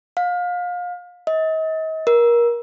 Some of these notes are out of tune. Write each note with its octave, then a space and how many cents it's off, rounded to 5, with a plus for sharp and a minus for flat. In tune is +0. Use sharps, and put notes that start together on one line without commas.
F5 +30
D#5 +40
A#4 +25